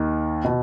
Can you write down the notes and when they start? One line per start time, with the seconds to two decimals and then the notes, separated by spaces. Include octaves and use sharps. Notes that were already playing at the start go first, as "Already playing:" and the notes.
Already playing: D#2 D#3
0.44 B2